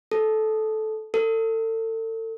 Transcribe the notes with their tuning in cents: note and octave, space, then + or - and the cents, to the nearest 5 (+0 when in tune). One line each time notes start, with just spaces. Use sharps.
A4 -15
A4 +35